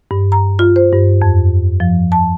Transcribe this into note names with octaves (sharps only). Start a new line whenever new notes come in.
G2
A#5
F4
C5
G2
F2
F3
A5